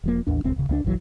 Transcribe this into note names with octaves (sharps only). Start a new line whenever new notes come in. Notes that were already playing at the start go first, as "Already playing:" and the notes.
E1 F3 A#3
A1 D#2 D4
D#1 C#2 C4
D1 C#3
C#2 A3 D4
F#1 B1 E3 F#3